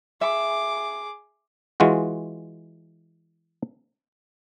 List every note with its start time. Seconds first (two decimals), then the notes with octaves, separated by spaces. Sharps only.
0.21 G#4 E5 D6
1.80 E3 G#3 F4 F#4